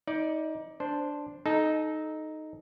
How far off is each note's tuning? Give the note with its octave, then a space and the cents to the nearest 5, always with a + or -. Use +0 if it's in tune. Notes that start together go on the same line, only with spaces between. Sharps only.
D#4 +25 D5 +0
D4 +0 C5 +0
D#4 +0 A4 -25